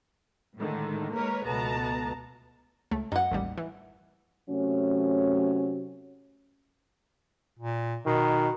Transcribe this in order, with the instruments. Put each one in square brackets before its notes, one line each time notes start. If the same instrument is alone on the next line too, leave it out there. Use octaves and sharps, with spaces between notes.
[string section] A2 D3 D#3 G#3
G#3 A#3 A#4 B4 C#5
C#2 B2 A3 B3 A5 A#5
[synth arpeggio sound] C#2 A3
[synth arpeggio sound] F#2 [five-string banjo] D#4 F#5
[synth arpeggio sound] A1 D#2 G3
E3
[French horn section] C3 F#3 A3 C#4
[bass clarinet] A#2
[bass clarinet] B2 [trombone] D#3